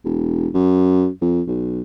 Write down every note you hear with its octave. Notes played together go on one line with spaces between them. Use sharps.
E1
F#2
F2
B1